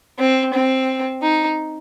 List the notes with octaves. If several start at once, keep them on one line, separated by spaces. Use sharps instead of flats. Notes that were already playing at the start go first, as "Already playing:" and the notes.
C4
C4
D#4